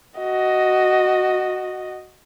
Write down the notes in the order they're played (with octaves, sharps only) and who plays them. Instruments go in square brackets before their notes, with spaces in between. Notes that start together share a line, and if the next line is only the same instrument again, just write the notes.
[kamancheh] F#4 D#5